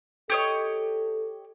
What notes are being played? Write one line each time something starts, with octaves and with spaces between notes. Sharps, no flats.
G4 A4 C#5 D#5